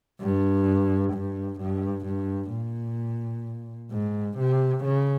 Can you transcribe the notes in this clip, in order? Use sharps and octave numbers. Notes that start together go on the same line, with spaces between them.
G2
G2
G2
G2
A#2
G#2
C3
C#3